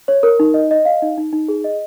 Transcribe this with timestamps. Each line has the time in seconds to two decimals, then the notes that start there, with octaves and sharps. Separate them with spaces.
0.08 C#5
0.23 A#4
0.40 D#4
0.54 D#5
0.71 D#5
0.85 F5
1.02 D#4
1.18 D#4
1.33 D#4
1.48 G#4
1.64 D#5